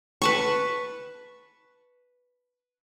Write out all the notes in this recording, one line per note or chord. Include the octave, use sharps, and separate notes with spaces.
B4 A5 C#6